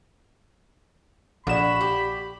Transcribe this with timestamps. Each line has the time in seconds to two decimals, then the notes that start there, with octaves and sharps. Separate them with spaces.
1.47 A#1 F#4 A4 D5 B5 E7
1.81 G4